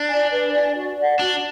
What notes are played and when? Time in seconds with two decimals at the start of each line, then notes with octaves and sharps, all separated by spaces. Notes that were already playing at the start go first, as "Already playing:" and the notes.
Already playing: D4
0.09 D5 G#5
0.31 B4
0.53 D5 G#5
0.75 F#4
0.97 D5 F#5
1.19 D4 F#4